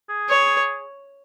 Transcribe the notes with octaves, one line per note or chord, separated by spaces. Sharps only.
G#4
C#5